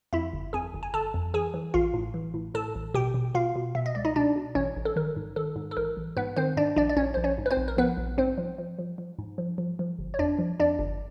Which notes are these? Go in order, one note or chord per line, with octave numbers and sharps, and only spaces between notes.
F2 E4 E5
G1
F2 G#4 G#5
G1
G#5
G1 A4 A5
F2
E3 G#4 G#5
E3
A1 F4 F5
A2
E3
A2
A2 A4 A5
A1
B2 G4 G5
B2
B2 F4 F5
B2
B2 E5
D#5
C#2 D5
D#4 D#5
B2 D4 D5
B2
A1 C#4 C#5
A1
A4
D#3 A#4
G#2
D#3 A4
G#2
A4
A1 A#4
A1
G#2 B3 B4
D#3 C4 C5
G#2 D4 D5
A#1 D4 D5
D5
A#1 C#4 C#5
A#1 C5
C#4 C#5
G#2
B4
C4 C5
A#1
A#4
F3 B3 B4
A#1
G#2 C4 C5
F3
F3
F3
F3
G#2
F3
F3
F3
G1
C#5
F2 D4 D5
F3
F2 D4 D5
G1